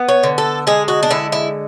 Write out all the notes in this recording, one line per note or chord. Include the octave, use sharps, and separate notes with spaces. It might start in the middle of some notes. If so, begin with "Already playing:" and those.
Already playing: B3
C#5
D3
A4
G#3 G#4
F#4
D4
D3 E4
E4